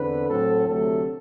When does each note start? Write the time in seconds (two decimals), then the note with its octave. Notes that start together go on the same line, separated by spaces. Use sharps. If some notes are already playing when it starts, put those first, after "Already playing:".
Already playing: E2 D3 C4 B4
0.28 A2 F#3 C4 A4
0.66 D2 C3 F#3 A3 A4